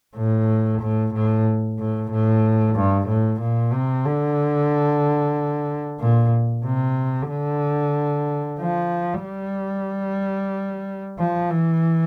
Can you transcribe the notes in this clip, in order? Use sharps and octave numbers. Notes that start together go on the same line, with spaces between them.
A2
A2
A2
A2
A2
G2
A2
A#2
C3
D3
A#2
C3
D3
F3
G3
F3
E3